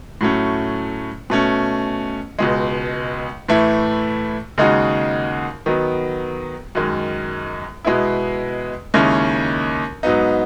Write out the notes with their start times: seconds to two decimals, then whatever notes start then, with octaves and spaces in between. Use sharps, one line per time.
0.21 A2 F#3 A3 C#4
1.30 B2 A3 C#4
2.39 C#2 B2 G#3
3.49 A2 E3 A3 E4
4.58 D#2 C#3 G#3 D#4 F#4
5.66 D#3 F#3 B3
6.75 F#2 D#3 G#3
7.85 B2 G#3 B3 E4
8.94 D#2 C#3 G#3 C#4 E4
10.03 G#2 F#3 B3 D#4